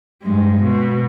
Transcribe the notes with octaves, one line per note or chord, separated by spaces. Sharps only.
G2 G#3
B2